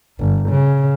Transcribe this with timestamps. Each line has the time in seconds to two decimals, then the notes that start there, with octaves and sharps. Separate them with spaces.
0.19 G1
0.49 C#3